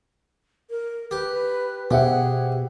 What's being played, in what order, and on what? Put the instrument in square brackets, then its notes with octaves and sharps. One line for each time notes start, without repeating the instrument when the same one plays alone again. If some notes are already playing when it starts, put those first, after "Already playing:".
[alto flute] A#4
[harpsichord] G4 [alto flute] B4
[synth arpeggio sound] B2 [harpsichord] G4 [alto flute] G#4 [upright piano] C5 E5 F#5